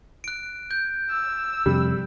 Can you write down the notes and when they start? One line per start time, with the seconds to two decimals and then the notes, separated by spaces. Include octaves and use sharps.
0.24 F#6 D7
0.71 G6
1.10 E6
1.66 F2 C3 G3